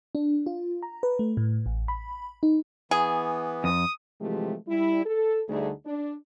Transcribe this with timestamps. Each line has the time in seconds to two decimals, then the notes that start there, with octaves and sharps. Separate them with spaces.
0.15 D4
0.46 F4
0.83 A#5
1.03 B4
1.19 A3
1.37 A2
1.66 A1
1.88 B5
2.43 D#4
2.91 E3 B3 G#4
3.64 F2 D#6
4.21 C3 E3 F3 G#3 A3 G4
4.68 G3 E4
5.06 A4
5.49 D2 D3 G3 A3 D#4 G#4
5.85 D4